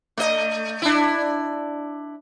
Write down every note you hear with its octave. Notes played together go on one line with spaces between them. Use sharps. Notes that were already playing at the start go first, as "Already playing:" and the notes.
A3 D#5
D4 E4